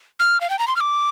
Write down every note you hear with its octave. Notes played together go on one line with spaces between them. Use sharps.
F6
F5
G5
A#5
C6
F6
D6